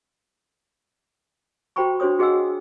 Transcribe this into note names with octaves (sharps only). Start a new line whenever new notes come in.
F#4 C5 G5 A#5 B5 C#6
D4 F#4 C5 C#5 D#6
F#4 G#4 D#5 F#5 G#5 E6